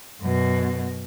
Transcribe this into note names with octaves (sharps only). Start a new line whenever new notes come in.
F#2 B2